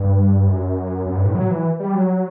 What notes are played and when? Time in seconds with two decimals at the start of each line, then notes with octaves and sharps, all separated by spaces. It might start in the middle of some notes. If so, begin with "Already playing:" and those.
Already playing: G2
0.47 F#2
1.06 F#2
1.16 G2
1.26 A2
1.35 F#3
1.51 E3
1.80 G3
1.95 F#3